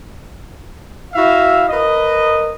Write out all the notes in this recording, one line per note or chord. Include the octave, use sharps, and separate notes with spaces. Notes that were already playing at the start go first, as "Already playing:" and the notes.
E4 F#4 E5 F5
A#4 B4 D#5